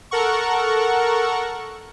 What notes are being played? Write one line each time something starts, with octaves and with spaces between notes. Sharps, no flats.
A4 A#4 F#5 C#6